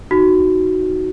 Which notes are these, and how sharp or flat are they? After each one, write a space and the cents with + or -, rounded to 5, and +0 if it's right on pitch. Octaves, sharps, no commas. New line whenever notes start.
D#4 +0 F#4 +0